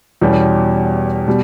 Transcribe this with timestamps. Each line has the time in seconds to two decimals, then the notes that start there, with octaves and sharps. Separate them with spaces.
0.21 E2 B2 G3 C#4 G4
1.27 B2 G3